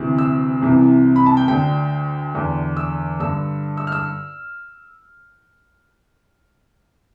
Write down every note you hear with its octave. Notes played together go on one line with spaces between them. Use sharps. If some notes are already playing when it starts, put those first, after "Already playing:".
Already playing: D2 C3 E3
E6
C2 C3 E3
B5
A5
G5
D2 D3 G5
E2 D3
E6
G2 D3 E6
E6
F6
E6